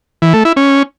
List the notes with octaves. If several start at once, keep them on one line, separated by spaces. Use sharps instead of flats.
E3
A3
E4
C#4